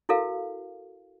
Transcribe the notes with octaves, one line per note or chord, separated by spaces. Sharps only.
E4 F#4 A4 A#4 F5